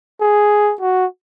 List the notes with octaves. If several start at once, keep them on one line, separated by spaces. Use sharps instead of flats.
G#4
F#4